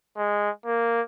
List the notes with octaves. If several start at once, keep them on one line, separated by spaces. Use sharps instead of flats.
G#3
A#3